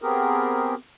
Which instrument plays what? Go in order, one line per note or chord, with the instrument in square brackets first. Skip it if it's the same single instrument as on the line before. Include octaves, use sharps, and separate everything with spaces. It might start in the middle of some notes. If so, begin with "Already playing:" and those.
[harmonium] B3 C4 G4 G#4 A#4